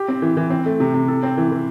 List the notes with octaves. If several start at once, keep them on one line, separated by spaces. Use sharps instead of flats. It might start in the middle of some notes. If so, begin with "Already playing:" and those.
Already playing: G4
C4
E3
E3
C4
A3
C3
C3
A4
C4
E3
E3